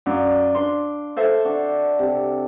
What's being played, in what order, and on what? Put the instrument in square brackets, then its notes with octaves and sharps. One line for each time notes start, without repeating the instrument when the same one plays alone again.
[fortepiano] F#2 [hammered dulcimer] D5 F5
[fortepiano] D4 C6
A4 C5 E5
[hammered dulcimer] D3 D4 F#4
C3 A4